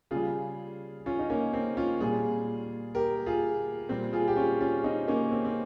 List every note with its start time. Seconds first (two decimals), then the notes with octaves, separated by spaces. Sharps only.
0.11 C#3 G3 F4 G#4
1.06 C#4 F4
1.19 D#4
1.30 A#3 C#4
1.53 C4
1.77 C#4 F4
2.00 A#2 G3 F4 G#4
2.95 G4 A#4
3.26 F4 G#4
3.89 A#2 G3 C4
4.13 F4 G#4
4.28 G4
4.36 C#4 F4
4.60 C#4 F4
4.84 C4 D#4
5.08 A#3 C#4
5.32 C4
5.44 C4